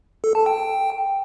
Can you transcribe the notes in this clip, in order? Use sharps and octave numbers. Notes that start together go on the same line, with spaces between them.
A4
A5
G5